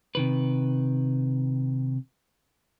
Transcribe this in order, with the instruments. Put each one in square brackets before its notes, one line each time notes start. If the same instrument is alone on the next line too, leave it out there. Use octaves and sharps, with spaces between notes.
[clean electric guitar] C3 D#3 B4